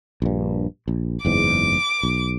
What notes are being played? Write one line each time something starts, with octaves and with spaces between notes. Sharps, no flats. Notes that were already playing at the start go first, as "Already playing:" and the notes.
A#1 G2
A#1
F#1 E2 G#2 D6
B1